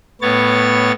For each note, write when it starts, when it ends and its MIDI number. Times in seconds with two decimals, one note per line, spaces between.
0.21 0.92 45
0.21 0.92 59
0.21 0.92 73
0.21 0.92 93